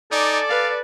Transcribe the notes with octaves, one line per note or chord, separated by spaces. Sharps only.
D#4 A4 D5 G#5 D6
B4 F5